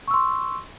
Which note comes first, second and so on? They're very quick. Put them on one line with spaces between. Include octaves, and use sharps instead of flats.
C#6 E6 C6